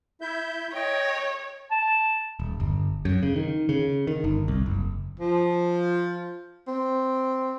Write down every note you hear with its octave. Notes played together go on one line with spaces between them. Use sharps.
E4 E5 G6
C#5 D#5 G5
A5
D#1
G1
F#2
C#3
D#3
C#3
D#3
G1
C2
F#1
F3
C4